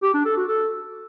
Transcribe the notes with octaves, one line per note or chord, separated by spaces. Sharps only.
G4
D4
A4
F#4
A4